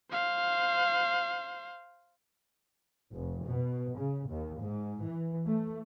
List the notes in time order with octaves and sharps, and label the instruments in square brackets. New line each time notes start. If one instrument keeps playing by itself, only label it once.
[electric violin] C5 F5
[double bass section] F1
B2
C#3
D#2
G#2
E3
A3